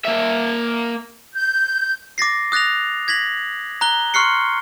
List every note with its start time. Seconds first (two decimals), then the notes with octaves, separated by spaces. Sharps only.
0.05 A#3 E5
1.35 G6
2.18 D6 A6 A#6 C7
2.52 D#6 F#6 A6 A#6 F7
3.08 G#6 A#6 B6 F#7
3.81 A#5 F#6 G7
4.14 C6 C#6 F6 F#6 C7 C#7